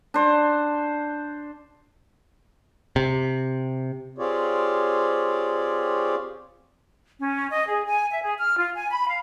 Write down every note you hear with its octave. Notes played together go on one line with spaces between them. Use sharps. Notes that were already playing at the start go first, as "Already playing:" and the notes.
D4 C5
C3
C4 F4 G4 G#4 C#5 D5
C#4
D#5
G#4
G#5
E5
G#4
F6
F4
G#5
B5
F5